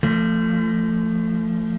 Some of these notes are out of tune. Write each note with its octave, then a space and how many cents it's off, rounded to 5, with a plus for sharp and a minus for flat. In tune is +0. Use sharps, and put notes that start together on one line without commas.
F3 -25 A3 +20